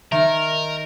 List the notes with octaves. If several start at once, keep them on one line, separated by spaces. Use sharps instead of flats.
D#3 A#4 E5